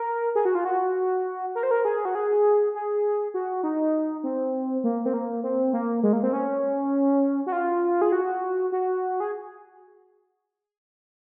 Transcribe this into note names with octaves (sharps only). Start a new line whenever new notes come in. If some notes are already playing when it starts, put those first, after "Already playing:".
Already playing: A#4
G#4
F#4
F4
F#4
A#4
C5
A#4
G#4
F#4
G#4
G#4
F#4
D#4
C4
A#3
C4
A#3
C4
A#3
G#3
A#3
C4
C#4
F#4
F4
G#4
F#4
F#4
G#4